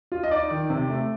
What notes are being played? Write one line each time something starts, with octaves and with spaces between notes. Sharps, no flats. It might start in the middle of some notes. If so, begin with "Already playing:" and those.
F4
D#5
D#4 D5
D#3
C3
A3